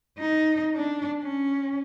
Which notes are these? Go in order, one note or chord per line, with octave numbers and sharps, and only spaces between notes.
D#4
D4
C#4